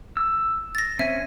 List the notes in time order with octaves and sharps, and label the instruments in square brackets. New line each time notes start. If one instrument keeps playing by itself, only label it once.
[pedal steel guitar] E6
[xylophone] A6 A#6
[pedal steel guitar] C4 C#4 G#5 [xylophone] E5